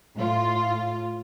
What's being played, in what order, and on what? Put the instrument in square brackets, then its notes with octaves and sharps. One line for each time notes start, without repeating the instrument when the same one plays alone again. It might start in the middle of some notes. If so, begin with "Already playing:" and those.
[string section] A2 F4